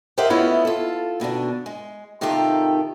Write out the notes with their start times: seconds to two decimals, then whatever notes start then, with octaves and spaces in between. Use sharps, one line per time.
0.18 G4 A#4 C5 D#5 E5 F#5
0.30 A3 B3 C#4 E4 F4 D#5
0.65 F4 A4
1.20 D#2 B2 D3 D4
1.66 G#3
2.21 C3 D#3 D#4 F4 G4 A4